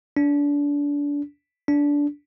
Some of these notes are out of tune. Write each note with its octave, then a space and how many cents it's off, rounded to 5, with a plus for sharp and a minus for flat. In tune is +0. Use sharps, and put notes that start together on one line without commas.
D4 -30
D4 -20